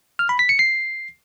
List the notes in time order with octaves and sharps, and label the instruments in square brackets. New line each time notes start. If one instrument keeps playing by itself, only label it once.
[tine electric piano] F6
B5
B6
C#7
C7